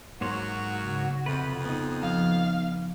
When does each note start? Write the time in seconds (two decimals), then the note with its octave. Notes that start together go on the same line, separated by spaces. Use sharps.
0.21 G#2 F#3 A#3 F#4 C#5 C6
0.83 C#3
1.26 F2 C3 F4 B4
1.66 B3 D#4
2.02 F3 F5